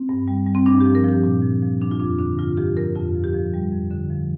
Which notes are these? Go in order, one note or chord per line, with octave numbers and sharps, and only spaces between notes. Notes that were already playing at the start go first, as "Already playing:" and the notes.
Already playing: C4
G2
G3
G3
C4
G2 D4
F3 G4
A#4
F3 G4
A#2
F3
F3
F3 D4
F4
F2 D4
D3 D4
G2 F4
F3 G4
F3 A#4
F2 F4
F3
G4
F3
G3
F2
D3
F3